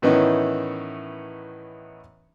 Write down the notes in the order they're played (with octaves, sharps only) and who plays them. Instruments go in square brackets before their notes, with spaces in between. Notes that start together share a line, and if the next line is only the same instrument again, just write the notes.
[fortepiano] A2 D#3 E3 B3 C#4 D#4